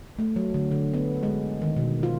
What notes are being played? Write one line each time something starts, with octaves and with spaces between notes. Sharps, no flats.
A3
F#3
D3
D3
B3
G#3
D#3
B2
F4